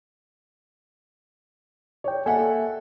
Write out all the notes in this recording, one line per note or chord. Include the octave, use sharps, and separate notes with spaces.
C#5 D5 G5
A#3 A4 E5 F#5 G#5